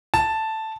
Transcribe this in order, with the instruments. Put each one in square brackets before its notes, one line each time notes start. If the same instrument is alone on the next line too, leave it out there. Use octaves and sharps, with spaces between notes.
[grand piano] A5